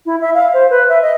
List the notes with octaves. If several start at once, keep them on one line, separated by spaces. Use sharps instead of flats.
E4
E5
F5
C5
B4
E5
D#5